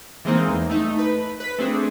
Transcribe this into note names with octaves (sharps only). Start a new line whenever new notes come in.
E3 G#3 A#3 C4 D#4
E2
A3 D#4
B4 B5
B4 B6
A3 C4 D4 G#4